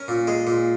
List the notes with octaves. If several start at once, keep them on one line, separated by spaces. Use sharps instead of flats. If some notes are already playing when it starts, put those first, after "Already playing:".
Already playing: C#4 A#4
A#2
G#3
A#2